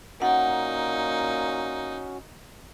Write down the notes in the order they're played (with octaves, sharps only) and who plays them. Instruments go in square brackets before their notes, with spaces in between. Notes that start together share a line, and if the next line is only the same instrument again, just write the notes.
[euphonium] A#2 [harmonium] C#4 F#4 [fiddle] D#4 [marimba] F#5